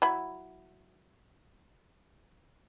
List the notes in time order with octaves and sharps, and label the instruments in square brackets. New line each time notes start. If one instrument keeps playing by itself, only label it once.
[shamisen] F#3 E4 B5